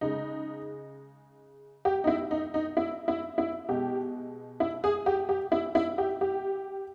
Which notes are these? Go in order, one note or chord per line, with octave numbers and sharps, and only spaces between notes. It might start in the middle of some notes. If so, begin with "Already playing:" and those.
C#3 G#3 D#4
G4
D#4
E4
D#4
D#4
E4
E4
E4
B2 G#3 G4
E4
G#4
G4
G4
E4
E4
G4
G4